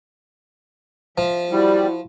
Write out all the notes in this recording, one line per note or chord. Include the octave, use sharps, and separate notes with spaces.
F3 E5
G3 E4 F#4